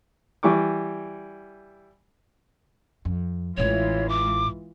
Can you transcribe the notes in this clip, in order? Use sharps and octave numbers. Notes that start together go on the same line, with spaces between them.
E3 G3 C#6 D6
F2
A1 A2 E3 G#3 F4 C#5
D6